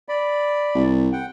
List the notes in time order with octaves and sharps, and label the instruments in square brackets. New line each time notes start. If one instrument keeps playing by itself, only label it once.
[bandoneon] D5 B5
[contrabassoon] C2
[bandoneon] F#5 G5